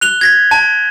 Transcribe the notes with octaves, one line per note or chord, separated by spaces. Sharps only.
F#6 F7 G7
G#6 A#6 B6
A5